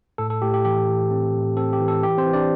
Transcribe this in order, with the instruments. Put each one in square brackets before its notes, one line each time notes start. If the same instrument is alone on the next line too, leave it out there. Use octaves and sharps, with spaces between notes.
[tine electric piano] A2 A4
A4
A2 G4
G4
E3 G4
E3
C4
A2
C4 A4
G4
E3
A4
E3 G4
C4 C5
E3
D4 D5